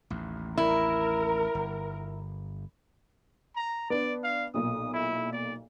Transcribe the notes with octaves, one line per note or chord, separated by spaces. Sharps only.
A1 D#2
E4 A#4
G1
A#5
B3 D4 D5
F5
B1 A#2 D#6
E4
D5